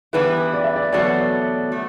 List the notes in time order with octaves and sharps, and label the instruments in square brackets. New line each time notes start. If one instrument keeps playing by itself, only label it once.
[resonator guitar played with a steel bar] G2 E3 G3 B3 E4 [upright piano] B4
[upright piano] D5
E5
D5
[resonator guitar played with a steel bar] E2 B2 F#3 A3 [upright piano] D5
[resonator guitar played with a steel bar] A3